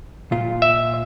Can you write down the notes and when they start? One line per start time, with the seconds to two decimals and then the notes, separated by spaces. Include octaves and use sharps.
0.32 A#2 F4
0.62 E5